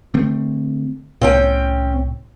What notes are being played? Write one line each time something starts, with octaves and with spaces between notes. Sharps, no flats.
D3 A3 C4
C2 A2 C4 C#4 G5